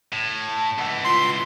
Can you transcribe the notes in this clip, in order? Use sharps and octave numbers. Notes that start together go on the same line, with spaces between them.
A2
A5
C#2 E3 F#5
F4 C6